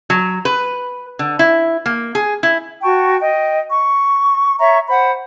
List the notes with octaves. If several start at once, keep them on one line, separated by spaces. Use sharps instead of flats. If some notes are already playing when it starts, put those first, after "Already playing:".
F#3
B4
D3
E4
A#3
G#4
E4
F#4 G5 A5 C#6
D#5 G5
C#6
C#5 E5 A#5 C#6
C5 F#5 B5